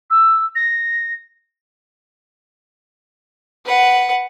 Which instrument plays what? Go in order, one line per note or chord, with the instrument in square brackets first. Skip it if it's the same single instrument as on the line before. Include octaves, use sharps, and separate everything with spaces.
[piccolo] E6
A#6
[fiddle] B4 F#5